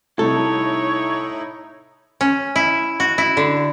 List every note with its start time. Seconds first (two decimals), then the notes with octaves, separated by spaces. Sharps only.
0.19 C2 A2 D#4 E4 A4 C#5
2.21 C#4
2.56 E4
3.00 F#4
3.18 E4
3.37 D3